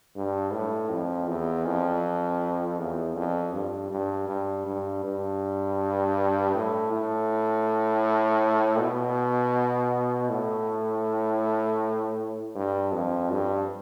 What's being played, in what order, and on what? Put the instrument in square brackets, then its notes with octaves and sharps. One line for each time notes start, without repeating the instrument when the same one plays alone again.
[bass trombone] G2
A2
F2
E2
F2
E2
F2
G2
G2
G2
G2
G2
A2
A2
B2
A2
G2
F2
G2